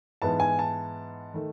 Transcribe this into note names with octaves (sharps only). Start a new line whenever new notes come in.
G#2 E3 B3 A5
G#5
A5
D#3 A3